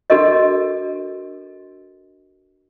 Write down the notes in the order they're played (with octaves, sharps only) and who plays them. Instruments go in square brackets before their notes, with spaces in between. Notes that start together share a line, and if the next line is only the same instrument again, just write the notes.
[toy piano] D4 F#4 A4 A#4 D#5